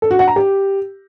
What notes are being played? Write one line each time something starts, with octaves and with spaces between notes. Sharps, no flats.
A4
F#4
F#5
A#5
G4